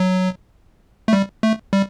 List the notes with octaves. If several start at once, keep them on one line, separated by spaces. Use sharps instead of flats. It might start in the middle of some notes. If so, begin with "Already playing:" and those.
Already playing: F#3
A3
G3
A3
G3